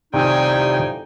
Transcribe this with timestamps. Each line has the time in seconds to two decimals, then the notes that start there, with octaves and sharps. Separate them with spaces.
0.14 F2 A2 C3 D#3 G3 D#4 G5 G#5